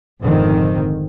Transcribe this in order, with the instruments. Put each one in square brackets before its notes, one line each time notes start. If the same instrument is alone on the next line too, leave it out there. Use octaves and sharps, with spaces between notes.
[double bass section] F1 G#2 D3 D#3 C4